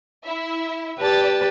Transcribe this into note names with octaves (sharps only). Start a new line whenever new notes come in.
E4 E5
G4 B4 D5 A5 A6